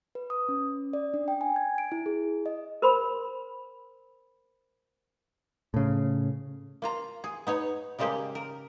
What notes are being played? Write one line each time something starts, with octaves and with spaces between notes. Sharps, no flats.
B4
D#6
C#4
D5
D4
G5
G#5
G#6
D7
E4
G#4
D#5
A#4 C5 B5 C6
A2 C#3
A#3 F4 A#5
G#4
B3 D#4 C#5
C#3 G3 G#3 A#3 G4 G#4
A#4